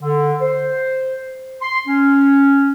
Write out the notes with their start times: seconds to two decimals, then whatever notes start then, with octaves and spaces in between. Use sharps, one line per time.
0.02 D3
0.40 C5
1.61 C6
1.87 C#4